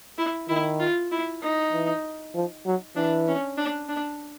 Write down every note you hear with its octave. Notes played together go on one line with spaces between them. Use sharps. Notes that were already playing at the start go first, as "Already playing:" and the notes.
E4
D#3 E4
F4
E4
D#4
E3
F3
F#3
E3 D4
C#4
D4
D4